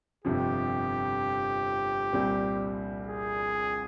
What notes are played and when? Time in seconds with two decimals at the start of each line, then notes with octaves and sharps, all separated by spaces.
0.25 G1 F2 C3 F3 C4 G4
2.13 C2 A#2 G3 C4
3.07 G#4